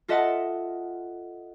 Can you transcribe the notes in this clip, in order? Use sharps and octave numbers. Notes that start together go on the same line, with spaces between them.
F4 A4 D#5 E5 F#5 A5